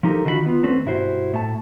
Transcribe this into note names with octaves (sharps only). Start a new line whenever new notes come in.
F3 D#4 G4 A4 A#4
D3 D#3 F4 F#4 G#4 B5
B3 F4
D#2 A3 C4 C#4 B4
B1 G2 E4 F#4 C5
A2 A5